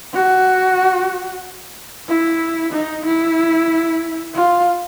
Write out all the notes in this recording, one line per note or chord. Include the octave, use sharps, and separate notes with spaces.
F#4
E4
D#4
E4
F4